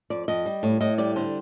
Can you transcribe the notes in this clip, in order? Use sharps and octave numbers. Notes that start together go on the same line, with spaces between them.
F2 D5
F2 D#5
G3
A2
A2 D#5
G3 D5
D3 C5